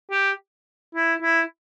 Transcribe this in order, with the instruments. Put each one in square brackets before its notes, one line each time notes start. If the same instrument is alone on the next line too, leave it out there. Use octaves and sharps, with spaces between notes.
[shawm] G4
E4
E4